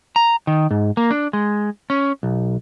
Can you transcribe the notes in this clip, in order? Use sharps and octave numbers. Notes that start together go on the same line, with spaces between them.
A#5
D#3
G#2
A#3
D4
G#3
C#4
B1